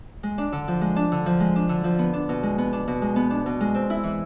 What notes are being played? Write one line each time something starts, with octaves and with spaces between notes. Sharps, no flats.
G#3
D4
D3
F3
G#3
D4
D3
F3
G#3
D4
D3
F3
B3
D4
B2
G#3
B3
D4
B2
G#3
B3
D4
B2
G#3
C4
E4
E3